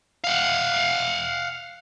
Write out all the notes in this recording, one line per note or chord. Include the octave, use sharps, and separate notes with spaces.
F5 F#5